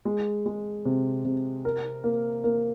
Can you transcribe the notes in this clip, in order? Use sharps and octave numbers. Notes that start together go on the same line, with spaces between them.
G#3
G#3
C3
C3
A#4
A#3
A#3